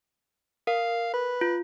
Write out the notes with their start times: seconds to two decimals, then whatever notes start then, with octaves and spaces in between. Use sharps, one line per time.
0.67 A#4 F5
1.13 B4
1.41 F4